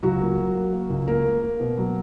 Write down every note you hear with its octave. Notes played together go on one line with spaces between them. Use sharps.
C#2 F#3 F#4
A#3
F#3
A#3
A#3
C#2
A#3 A#4
A#3
A#3
B2
F#3